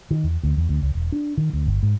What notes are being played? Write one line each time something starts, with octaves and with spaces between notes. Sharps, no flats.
D#3
E2
D2
E2
D2
C#2
E1
D4
D#3
D2
G1
G#2